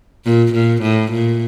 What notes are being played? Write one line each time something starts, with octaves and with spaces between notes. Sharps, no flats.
A#2
A#2
A2
A#2